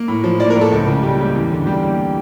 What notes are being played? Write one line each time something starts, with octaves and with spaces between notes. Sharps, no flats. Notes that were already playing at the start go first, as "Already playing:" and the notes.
Already playing: A#3
A2
F3
A#3 D5
A#4
A2
A4
C#2
C#3
G3 G4
A#3 G4
E2
D3
G3 G4
A#3